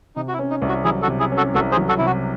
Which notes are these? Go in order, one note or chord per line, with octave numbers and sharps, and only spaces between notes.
C3 D#4
F#4
E4
C#4
D#4
C2
F#4
F#3 E4 G#4
F#4 A4
C3
E4 G#4
C#4
F#4 A4
C2 F#4 A4
G#4 C5
F#3
F#4 A4
C3 E4
F#4